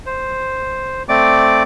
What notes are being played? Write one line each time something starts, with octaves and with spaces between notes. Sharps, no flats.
C5
A3 C4 D5 D6